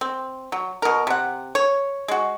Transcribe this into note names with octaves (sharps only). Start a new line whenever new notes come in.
C4
F#3
B2 A#4
C3 F#5
C#5
G#3 F#4